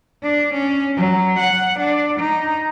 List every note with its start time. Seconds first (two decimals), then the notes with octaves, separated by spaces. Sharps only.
0.23 D4
0.54 C#4
0.96 F#3
1.39 F#5
1.79 D4
2.19 D#4